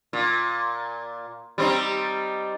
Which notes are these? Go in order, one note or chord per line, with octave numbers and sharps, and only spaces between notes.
A#2
G3 C4 D#4